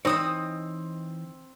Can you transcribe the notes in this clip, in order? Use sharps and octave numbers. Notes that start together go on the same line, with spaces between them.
E3 C4 D#4 C#5 D#6 E6